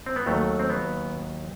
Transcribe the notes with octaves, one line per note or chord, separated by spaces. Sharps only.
C4
B3
D#2 D#3 F#3 A3
C4
B3